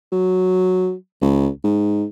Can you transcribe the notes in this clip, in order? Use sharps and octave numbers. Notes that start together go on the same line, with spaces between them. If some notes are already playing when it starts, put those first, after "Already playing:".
F#3
C#2
G#2